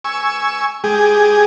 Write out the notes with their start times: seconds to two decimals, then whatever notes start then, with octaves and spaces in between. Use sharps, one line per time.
0.05 G#5 C#6 E6
0.84 G#3 G4 G#4